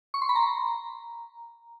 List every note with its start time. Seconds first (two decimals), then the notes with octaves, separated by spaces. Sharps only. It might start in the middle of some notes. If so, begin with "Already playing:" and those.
0.14 C#6
0.22 C6
0.29 B5
0.36 A#5